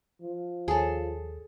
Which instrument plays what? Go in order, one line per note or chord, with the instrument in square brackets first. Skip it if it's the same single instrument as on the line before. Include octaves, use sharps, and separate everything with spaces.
[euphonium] F3
[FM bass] D#2 [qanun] G#4 A4 [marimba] C#5 G#5 A5